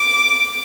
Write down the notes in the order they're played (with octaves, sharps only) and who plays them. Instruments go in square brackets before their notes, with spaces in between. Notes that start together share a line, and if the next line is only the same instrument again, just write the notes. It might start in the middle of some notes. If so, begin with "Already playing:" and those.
Already playing: [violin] D6